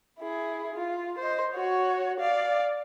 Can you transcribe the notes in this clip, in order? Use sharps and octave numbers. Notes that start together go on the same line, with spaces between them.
E4 G#4
F4
C5 D#5
F#4 C#5
D5 F5